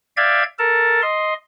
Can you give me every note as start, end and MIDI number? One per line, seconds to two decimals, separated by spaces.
0.17 0.43 74
0.17 0.43 76
0.17 0.43 77
0.17 0.43 79
0.17 0.43 92
0.59 1.01 69
0.59 1.01 70
0.59 1.01 81
1.02 1.34 75
1.02 1.34 84